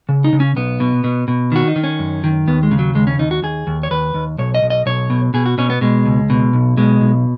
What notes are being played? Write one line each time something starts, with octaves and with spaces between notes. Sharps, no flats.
C#3
D#4
C#3
C#4
B1 B3
B2
B2
B2
D#3 F#4
D#4
D#3
C#4
F#2
D#3
D#2 B3
G#3
C#3
F#3
D#2 G#3
C#4
D#2 D#4
F#4
D#2 G#4
D#2
C#5
D#2 B4
D#2
B1 C#5
D#5
B1
D#5
B1 C#5
B2
B2 G#4
F#4
B2 C#4
B3
B2 G#3
C#2
B2
B1
B2 G#3
B1